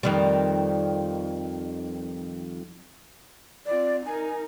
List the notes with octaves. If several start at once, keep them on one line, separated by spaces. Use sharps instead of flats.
F2 D#3 G3
C4 F4 D5
D#4 A#4 G#5